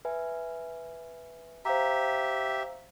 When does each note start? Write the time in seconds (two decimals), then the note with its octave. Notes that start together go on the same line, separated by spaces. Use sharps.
0.05 B4 E5 G#5
1.65 G4 C5 E5 F5 A#5